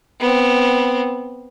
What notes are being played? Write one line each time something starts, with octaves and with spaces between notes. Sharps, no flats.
B3 C4